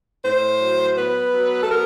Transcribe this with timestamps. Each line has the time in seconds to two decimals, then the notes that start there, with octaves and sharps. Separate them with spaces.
0.25 A2 C5
0.61 F#3
0.98 B3 B4
1.34 F#3
1.63 A4
1.71 B3 A#4